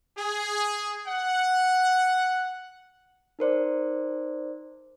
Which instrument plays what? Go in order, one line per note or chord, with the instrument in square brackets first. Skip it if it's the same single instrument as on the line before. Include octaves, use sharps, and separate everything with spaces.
[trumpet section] G#4
F#5
[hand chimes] D#4 A#4 C5 D5